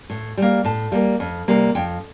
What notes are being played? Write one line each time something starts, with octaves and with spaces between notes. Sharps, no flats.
A2
G3 A#3
A2 A5
G3 A#3
F2
C3 G3 A#3
F2 G5